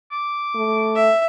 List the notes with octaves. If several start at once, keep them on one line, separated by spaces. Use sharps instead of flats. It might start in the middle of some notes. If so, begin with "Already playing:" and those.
D6
A3
E5